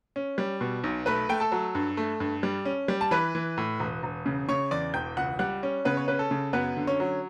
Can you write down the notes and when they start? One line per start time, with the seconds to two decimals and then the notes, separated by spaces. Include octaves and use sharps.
0.16 C#4
0.38 G3
0.61 B2
0.84 B1
1.06 A3 B4 B5
1.29 A3 G5
1.40 A4 A5
1.52 F#3
1.75 G2
1.97 A3
2.20 G2
2.43 G3
2.65 C#4
2.88 G3
3.01 A5
3.11 E3 B4 B5
3.35 E3
3.58 A2
3.80 E1
4.03 E1
4.26 C#3
4.49 C#3 C#5 C#6
4.71 E2 D5 D6
4.94 E1 G5 G6
5.17 C#2 F#5 F#6
5.39 G3 F#5 F#6
5.63 C#4
5.85 C#3 B3 B4
5.97 C#5
6.08 C#4 B4
6.19 A4
6.31 C#3
6.53 F#2 B3 B4
6.77 D3
6.87 C#4 C#5
7.00 F#3